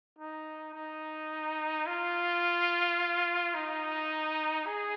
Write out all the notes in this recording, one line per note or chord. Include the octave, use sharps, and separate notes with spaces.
D#4
D#4
F4
D#4
G#4